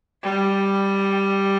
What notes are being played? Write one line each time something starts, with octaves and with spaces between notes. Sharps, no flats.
G3